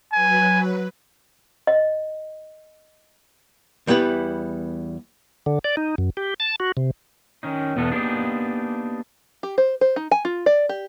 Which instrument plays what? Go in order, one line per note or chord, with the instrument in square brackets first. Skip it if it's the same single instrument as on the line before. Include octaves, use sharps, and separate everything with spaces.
[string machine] F#3 B4 [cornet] G#5
[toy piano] D#5
[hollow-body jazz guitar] E2 G3 B3 E4 B4
[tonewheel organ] D3
D5
D#4
F#2
G4
A5
F#4
C3
[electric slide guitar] D#3 C#4 D#4
E2 B2 B3 A4
A#3 B3 D4 D#4 G4 G#4
[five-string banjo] G4
C5
C5
D#4
G#5
F4
D5
G4